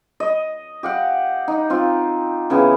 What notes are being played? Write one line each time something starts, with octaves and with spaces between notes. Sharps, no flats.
D#5
G4 F5 F#5
D#4
C4 F4
C#3 E3 B3